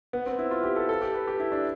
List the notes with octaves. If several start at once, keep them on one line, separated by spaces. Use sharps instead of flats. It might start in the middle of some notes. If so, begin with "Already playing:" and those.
B3
C4
E4
F4
G4
A4
A4
G4
B4
G4
E4
D4